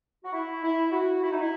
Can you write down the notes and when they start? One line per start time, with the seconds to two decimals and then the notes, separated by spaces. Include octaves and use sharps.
0.24 F#4
0.33 E4
0.63 E4
0.92 F#4
1.22 E4
1.31 D#4
1.41 E4